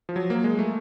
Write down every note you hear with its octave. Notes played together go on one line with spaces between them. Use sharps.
F3
F#3
A#3
G#3
A3